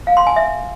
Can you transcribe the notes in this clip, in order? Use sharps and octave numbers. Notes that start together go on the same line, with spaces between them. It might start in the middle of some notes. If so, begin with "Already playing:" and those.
F5
C6
G#5
E5